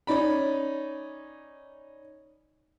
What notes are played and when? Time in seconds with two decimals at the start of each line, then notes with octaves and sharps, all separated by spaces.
0.07 C#4 D#4 D5 B5